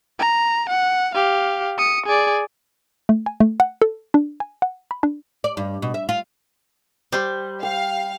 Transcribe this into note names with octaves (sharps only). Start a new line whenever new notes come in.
A#5
F#5
G4 F5
D#6 C#7
G#4 D5
A3
G#5
A3
F#5
A4
D4
G#5
F#5
B5
D4
D5
G2
B2
E5
F4
G3 C5 D6
F5 G5